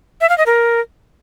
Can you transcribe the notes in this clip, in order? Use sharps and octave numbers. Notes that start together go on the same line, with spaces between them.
E5
F5
D#5
A#4